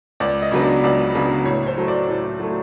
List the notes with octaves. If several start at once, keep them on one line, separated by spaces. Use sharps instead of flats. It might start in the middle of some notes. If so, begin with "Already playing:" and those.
C#2 D5
D#5
C#3 F#3 B3 D4
D5
C#2 D5
C#3 F#3 B3 D4
A2 C#5
C5
F#3 A3
D5
A2
F#3 A3